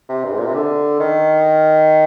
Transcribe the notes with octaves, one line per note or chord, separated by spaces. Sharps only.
C3
G2
G#2
A#2
C3
D3
D#3